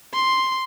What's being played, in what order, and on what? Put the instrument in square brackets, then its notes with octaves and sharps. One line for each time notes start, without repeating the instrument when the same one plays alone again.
[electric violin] C6